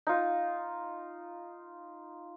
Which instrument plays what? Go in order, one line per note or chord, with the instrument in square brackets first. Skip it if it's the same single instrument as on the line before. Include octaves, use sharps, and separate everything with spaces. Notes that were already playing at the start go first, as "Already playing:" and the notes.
[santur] D#4 F4